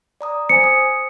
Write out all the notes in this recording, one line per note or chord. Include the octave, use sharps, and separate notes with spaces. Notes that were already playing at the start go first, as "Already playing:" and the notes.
D5 A#5 D#6
C5 G#5 C#7
D#6